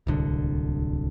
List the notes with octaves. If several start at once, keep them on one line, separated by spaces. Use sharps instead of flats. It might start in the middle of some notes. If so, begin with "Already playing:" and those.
D1 C2 D3